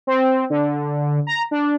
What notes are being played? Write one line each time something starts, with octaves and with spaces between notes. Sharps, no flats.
C4
D3
A#5
D4